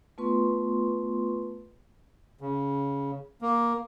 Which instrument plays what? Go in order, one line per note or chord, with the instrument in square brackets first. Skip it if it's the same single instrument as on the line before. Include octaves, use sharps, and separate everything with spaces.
[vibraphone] A3 B3 F4 B4 C6 C#6
[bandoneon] C#3
A#3